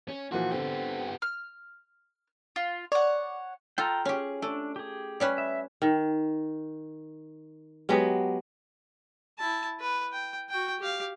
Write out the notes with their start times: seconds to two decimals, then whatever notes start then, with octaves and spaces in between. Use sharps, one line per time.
0.08 C#4
0.32 A#2 E3 F3 F#4
0.52 D3 B3 C4 G4
1.22 F6
2.56 F4
2.92 C#5 D5 F#5
3.78 F4 A4 G5 A#5
4.05 C#4 G4 G#4
4.42 A3 D4
4.76 G4 G#4
5.20 G3 C#4 B4
5.38 E5
5.82 D#3
7.89 F#3 G#3 B3 G4
9.39 E4 A5
9.81 B4
10.12 G5
10.50 F#4 G5
10.79 G4 F5